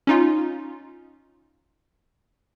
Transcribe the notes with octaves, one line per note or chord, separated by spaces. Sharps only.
C#4 D#4 F4